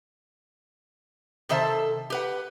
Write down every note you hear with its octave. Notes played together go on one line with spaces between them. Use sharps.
C3 D#3 A4 C5 E5 A5
G4 B4 F#5